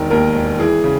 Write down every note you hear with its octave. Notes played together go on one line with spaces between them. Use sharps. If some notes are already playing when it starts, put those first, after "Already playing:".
Already playing: E1 D#3 A#4
D#2 A#4
E1
E3 G#4
C#3